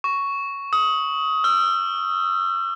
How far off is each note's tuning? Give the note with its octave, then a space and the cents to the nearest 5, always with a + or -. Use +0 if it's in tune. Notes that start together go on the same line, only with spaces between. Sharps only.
C#6 +5
D#6 +25
E6 +45